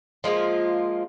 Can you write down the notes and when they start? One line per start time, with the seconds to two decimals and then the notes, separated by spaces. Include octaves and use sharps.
0.24 F3 G#3 A#3 F4